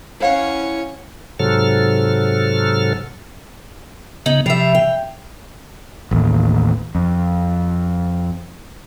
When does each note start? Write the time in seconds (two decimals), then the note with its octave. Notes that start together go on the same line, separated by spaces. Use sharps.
0.20 C#4 E4 C#5 F5 F#5
1.40 G#2 C3 F#3 A4 F6
4.26 C#3 B3 D#4
4.46 C3 F3 G3 E5
4.75 G5
6.11 A1 D#2
6.95 F2